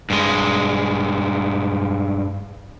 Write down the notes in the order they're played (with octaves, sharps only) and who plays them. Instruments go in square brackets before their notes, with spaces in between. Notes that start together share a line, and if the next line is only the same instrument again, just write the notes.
[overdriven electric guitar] G2 G#3